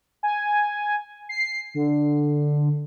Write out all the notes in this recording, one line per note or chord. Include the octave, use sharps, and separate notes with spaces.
G#5
C7
D3